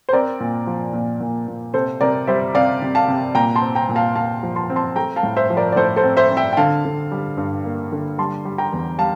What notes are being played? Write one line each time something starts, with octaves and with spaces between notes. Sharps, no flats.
C5
C4 A#4 D5
A#2
F3
A#2
A#2
A#2
C3 A4 C5
C3 A#4 D5
G3 C5 E5
C3 D5 F5
C3
F5 A5
C3
A#2 G5 A#5
A5 C6
C4
G5 A#5
A#2
F5 A5
A#2 F5 A5
F3
A5 C6
C4
A5 C6
A3 G5 A#5
F5 A5
A2
C5 E5
F3
A#4 D5
D5
A2 A4 C5
A4 C5
C4
C5 E5
C4
E5 G5
G5
D3 F5 A5
D3
G3
G2
A#3
D3
G3 A5 C6
G3
G5 A#5
E2
G3 F5 A5